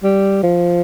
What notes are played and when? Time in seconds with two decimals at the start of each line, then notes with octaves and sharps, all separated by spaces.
0.03 G3
0.43 F3